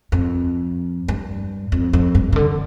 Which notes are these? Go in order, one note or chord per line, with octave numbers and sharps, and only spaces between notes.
F2
G2
F2
F2
G2
C3
D3